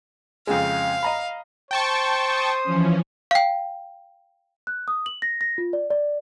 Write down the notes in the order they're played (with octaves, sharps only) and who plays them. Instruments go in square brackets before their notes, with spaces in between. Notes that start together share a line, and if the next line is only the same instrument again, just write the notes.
[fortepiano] F2 C#3 G#3 [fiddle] F5
[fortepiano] D#5 A#5 B5
[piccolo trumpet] C5 [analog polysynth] G5 A5 C#6
[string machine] D#6
E3 F3 C#4
[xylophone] F5 G5
[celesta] F#6
D#6
F#7
A#6
A#6
F4
D5
D5